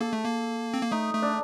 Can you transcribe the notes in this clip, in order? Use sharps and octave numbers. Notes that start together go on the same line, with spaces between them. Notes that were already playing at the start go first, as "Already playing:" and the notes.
A#3 A4
A3
A#3
C4
A#3
A3 D#4
A3
D4